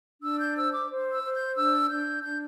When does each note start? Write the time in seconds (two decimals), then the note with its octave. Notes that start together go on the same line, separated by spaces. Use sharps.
0.22 D4 E6
0.39 G6
0.56 C5 E6
0.73 D6
0.89 C5
1.12 E6
1.23 C5
1.34 G6
1.56 D4 E6
1.89 D4 G6
2.23 D4 G6